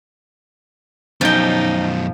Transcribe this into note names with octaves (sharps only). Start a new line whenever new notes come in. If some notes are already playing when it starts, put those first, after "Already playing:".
F#2 B2 F3 D#4 G5